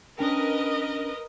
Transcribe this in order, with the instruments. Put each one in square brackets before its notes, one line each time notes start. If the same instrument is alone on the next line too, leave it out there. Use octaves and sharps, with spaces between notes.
[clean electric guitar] C#4 D4 G5 [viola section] A#4 B4 D#5